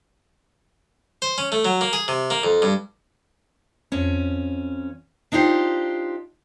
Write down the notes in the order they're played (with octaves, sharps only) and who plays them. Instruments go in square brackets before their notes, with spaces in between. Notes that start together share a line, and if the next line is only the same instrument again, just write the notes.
[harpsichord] C5
C#4
A3
F#3
A#3
G#4
C3
A#3
F2
G2
[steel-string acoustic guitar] F2 C#4
D4 D#4 F4 G4 C5